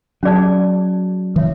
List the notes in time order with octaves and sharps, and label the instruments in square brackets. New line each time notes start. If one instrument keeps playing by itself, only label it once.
[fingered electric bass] F#3 [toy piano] C#4 G#4 D5 A5
[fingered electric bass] E3 [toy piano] A4 C#5 E5